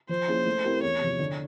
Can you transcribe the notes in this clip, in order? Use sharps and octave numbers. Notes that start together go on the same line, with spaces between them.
F3 C5
A#3 C#4 E4 G#4
A3
C4 E4 G4 A#4
E2 C#5
C3 F3
D3